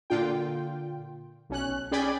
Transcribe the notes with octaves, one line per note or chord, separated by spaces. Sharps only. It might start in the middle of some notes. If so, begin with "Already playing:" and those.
A#2 D3 F4 G5
B1 C#4 F#6
C#4 G#4 D5 G5 G#5 B5